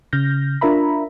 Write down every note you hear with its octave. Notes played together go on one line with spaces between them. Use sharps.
C#3 F6 G6 A#6
D4 F4 A#4 E5 A#5 B5